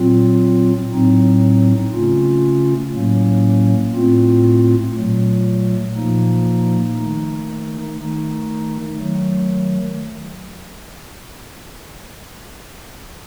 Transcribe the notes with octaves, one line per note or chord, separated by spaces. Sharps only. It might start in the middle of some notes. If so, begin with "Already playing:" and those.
Already playing: A#2 F#3 C4 F4
A2 F#3 C4 D#4
C#3 A3 C#4 F4
A2 F#3 A#3 C#4
A2 A3 C4 F4
A#2 F#3 A3
A#2 F3 A#3 D#4
D#3 A3 D#4
D#3 A3 D#4
D#3 F#3 A3